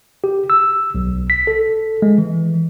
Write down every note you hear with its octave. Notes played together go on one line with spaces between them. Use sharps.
G4
E6
B1
B6
A4
G#3
E3